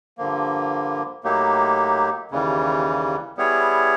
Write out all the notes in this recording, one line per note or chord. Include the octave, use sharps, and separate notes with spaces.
G2 D3 F3 A#3
A2 F#3 A#3 D#4 G4
D#2 C#3 E3 G3
G3 B3 E4 G#4 C#5